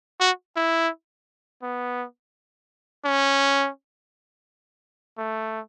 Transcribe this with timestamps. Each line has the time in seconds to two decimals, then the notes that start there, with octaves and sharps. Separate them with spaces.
0.20 F#4
0.57 E4
1.62 B3
3.05 C#4
5.18 A3